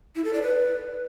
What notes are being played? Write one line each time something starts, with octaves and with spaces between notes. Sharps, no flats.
E4
A4
D5
B4